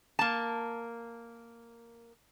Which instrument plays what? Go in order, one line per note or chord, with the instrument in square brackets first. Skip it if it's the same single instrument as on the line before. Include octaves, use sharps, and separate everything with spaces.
[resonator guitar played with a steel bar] A#3 A5